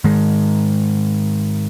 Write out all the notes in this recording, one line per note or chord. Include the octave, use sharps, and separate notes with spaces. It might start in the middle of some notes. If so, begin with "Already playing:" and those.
G#2 D#3 G#3